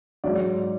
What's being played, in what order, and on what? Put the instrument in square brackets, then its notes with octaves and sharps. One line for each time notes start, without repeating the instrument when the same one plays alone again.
[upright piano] G#2 F#3 D5